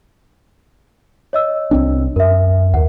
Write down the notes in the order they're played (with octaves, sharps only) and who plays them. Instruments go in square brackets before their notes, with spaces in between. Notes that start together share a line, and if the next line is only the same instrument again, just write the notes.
[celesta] C#5 D#5 E6
[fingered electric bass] C2 C4 D4
[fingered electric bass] F#2 [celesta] A#4 E5
[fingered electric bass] D#2 [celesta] A#4 F#5